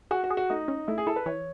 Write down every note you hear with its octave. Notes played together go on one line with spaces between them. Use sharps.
F#4 G#4
F#4
G#4
F#4
A3 D#4
C#4
A3 E4
G#4
E4 A4
B4
E3 C#5